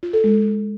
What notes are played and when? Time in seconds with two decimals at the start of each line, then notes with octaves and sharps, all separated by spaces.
0.03 F4
0.13 A4
0.24 G#3